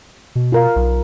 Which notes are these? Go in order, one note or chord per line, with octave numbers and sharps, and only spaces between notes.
B2
F4 A#4 F5
B1